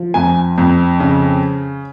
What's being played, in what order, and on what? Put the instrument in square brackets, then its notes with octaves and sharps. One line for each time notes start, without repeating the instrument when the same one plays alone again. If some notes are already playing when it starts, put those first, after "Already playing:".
Already playing: [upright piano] F3
F2 G#5
F2
C#3